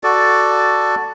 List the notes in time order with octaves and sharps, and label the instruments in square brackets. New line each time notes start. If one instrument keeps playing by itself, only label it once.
[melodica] F#4 A4 D5